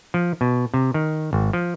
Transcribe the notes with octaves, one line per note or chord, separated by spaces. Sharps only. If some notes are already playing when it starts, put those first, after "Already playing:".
F3
B2
C3
D#3
G#1
F3